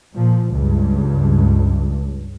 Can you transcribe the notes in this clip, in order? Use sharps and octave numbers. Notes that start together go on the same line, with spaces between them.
A#2 F3
C#2 G2